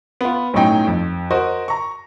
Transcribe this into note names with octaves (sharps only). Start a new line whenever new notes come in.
B3 F4
B1 A2 F#3 C#4 D#4 G5
F2
F#4 A#4 C5 D#5
A#5 C#6